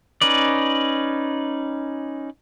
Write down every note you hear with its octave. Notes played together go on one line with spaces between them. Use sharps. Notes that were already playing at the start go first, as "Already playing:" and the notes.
C#4 D#4 B4 D5